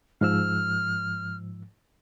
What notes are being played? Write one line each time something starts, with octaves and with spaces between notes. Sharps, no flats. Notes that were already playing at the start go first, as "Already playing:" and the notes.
G#2 F3 E6 F6